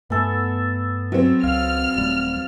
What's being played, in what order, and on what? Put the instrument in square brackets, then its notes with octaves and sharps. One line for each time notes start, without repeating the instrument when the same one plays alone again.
[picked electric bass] G2 A3 [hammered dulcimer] B3 A4 E5
[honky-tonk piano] F#3 C4 [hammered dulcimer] E5
[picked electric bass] C#2 [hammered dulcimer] F5 [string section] F6
[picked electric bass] D#1 G3 A3